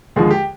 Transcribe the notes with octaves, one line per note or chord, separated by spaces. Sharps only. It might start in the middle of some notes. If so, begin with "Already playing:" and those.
D#2 D3 F3 G#3 G#4
G4